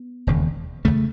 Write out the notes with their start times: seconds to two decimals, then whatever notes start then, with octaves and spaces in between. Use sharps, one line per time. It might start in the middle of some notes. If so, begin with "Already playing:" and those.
Already playing: B3
0.27 E1 D#2 C#3
0.85 D#2 C#3 A3